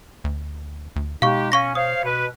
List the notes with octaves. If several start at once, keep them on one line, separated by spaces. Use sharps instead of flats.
D2
D2
B2 G#3 D#4 G4 F5 C#6
C#4 F5 C#6 A#6
C5 C#5 F5 D#6
B2 B4